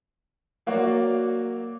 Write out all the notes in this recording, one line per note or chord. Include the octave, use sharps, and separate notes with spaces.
F#3 A#3 F#4 C#5 D5